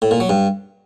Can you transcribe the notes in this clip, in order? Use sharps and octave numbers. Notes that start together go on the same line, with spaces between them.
A2
A#2
F#3
G2